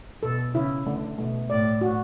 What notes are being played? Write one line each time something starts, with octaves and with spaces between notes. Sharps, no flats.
B2 A4
C#3 E4
D3 A3
B2 A3
A2 D5
F#4